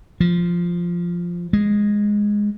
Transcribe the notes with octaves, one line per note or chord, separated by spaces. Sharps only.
F3
G#3